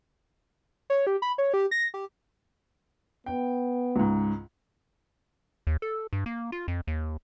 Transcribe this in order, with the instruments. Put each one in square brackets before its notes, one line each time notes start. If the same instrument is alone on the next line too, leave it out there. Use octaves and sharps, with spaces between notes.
[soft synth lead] C#5
G4
B5
C#5
G4
A#6
G4
[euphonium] B3 [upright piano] G5
[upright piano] C#2 G#2
[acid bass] D#2
A4
G2
A#3
F4
F2
D#2